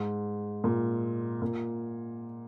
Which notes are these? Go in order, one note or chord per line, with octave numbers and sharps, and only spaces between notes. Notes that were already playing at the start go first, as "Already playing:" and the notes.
Already playing: G#2
A#2
A#2